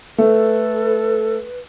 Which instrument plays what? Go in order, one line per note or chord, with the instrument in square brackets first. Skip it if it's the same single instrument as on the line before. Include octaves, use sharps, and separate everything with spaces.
[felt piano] A3 [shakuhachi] A4 [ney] B4